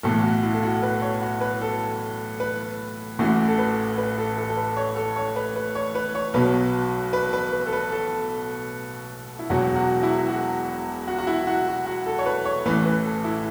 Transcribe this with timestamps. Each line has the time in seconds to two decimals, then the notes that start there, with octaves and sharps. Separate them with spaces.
0.03 B1 A2 E3 A4
0.23 F#4
0.43 E4
0.54 A4
0.63 F#4
0.82 B4
1.02 C#5
1.21 F#4
1.41 B4
1.62 A4
2.40 B4
3.19 A1 A2 E3 F#4
3.48 A4
3.58 B4
3.98 B4
4.18 A4
4.37 A4
4.49 A4
4.57 B4
4.77 C#5
4.96 A4
5.16 C#5
5.36 B4
5.56 B4
5.75 C#5
5.95 B4
6.15 C#5
6.34 B1 B2 F#3 B4
7.13 B4
7.33 B4
7.52 B4
7.66 A4
7.73 B4
7.92 A4
9.39 E4
9.49 E1 E2 B2 F#3 F#4
9.76 F#4
10.03 E4
10.28 F#4
11.07 F#4
11.18 F#4
11.27 E4
11.47 F#4
11.67 F#4
11.86 F#4
12.06 A4
12.19 C#5
12.26 B4
12.45 C#5
12.65 A1 A2 E3 B4
12.86 B4
13.05 A4
13.24 E4